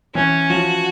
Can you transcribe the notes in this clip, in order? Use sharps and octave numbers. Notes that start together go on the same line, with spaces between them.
E3 C#4
F3 F#4